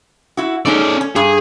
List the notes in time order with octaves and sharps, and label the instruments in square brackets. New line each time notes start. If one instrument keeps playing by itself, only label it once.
[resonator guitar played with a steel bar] E4 F#4
[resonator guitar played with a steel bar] A3 D#4 G#4 [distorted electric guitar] C#4 D5
[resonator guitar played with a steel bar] C#4
[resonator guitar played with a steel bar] G2 [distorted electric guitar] G#4